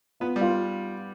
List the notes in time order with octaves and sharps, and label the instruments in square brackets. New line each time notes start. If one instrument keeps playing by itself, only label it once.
[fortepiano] B3 [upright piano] F4
[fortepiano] G3
[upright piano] F4